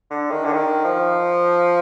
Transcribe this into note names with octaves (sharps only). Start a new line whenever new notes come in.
D3
D#3
D3
D#3
F3